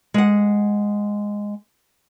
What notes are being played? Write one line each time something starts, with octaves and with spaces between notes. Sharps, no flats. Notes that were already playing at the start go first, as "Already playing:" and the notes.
G#3 F#5